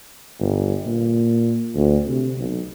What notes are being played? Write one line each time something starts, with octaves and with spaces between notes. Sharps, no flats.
G1
A#2
D2
C3
B1